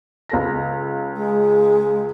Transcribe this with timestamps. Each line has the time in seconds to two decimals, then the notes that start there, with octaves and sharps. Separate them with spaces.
0.29 C#2 A4 A#6
1.15 G#3